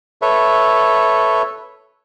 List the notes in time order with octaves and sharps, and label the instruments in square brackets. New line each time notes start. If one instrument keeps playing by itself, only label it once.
[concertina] A4 B4 C#5 E5